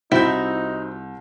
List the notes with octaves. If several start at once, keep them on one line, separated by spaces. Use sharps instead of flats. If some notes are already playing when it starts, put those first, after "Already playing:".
C2 C4 D#4 E4 F#4 D#5 E5 G6